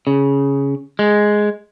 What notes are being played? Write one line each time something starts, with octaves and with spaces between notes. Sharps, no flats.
C#3
G#3